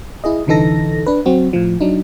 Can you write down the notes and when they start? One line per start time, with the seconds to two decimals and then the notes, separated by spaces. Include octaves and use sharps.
0.24 E4 G#4 D#5
0.47 C2 D3 E3 D#4 A4 A#6
1.06 D4 B4
1.26 F#3 C4 F#4
1.53 A2 F3
1.80 F#3 D4 D#4